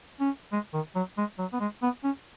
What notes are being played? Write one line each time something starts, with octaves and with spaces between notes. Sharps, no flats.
C#4
G#3
D#3
F#3
G#3
F#3
B3
G#3
B3
C#4